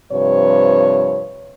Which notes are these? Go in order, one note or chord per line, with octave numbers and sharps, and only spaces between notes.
G2 C3 F3 B4 C#5